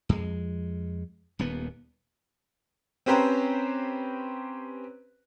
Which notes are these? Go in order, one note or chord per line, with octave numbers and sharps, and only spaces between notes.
F2 G#3
D#1 D#2 B3
C4 C#4 G4 B4 C5 A#5